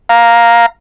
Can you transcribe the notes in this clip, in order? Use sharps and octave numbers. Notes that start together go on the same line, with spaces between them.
F5 A#5